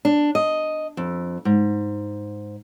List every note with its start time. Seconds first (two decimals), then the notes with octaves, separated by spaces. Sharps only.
0.05 D4
0.35 D#5
0.97 F2
1.45 G#2